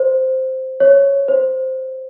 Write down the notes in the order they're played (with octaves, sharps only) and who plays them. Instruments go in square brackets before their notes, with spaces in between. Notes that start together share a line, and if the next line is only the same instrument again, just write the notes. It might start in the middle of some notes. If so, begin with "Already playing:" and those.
Already playing: [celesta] C5
C#5
C5